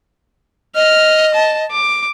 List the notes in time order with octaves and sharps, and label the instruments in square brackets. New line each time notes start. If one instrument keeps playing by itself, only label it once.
[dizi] D#5 [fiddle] F6
[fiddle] A5
D6